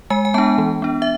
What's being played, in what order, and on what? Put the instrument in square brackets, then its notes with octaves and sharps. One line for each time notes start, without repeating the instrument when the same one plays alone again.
[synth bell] G#3 G#5
G#5
B3 D4 A5
E3
B3 D4
E5